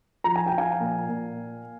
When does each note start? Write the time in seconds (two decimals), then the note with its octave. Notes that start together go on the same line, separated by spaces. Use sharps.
0.24 F3 A#5
0.36 G#5
0.46 G5
0.52 F3
0.58 F5 G#5
0.80 A#2
1.09 A#2